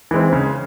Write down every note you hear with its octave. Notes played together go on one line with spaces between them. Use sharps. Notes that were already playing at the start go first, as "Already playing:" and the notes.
E3 G#3 C4
C#3